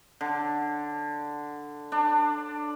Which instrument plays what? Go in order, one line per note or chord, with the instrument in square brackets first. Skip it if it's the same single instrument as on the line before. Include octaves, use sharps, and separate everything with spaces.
[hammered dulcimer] D3
D4